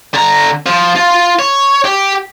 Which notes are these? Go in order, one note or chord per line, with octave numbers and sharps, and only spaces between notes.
D3 A#5
F3
F4
C#5
G4